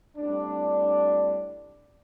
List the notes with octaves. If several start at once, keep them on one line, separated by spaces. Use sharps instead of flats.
A2 G3 C4 D4